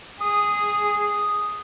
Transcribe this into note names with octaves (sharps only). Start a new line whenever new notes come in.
G#4 D#6